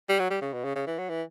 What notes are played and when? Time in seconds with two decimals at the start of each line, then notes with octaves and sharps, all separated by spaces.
0.09 G3
0.19 F#3
0.30 G3
0.42 C#3
0.53 B2
0.64 C#3
0.76 C#3
0.87 E3
0.99 F#3
1.09 E3